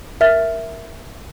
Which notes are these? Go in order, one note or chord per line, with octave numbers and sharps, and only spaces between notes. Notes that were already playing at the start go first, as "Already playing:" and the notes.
A#4 E5 F6 A6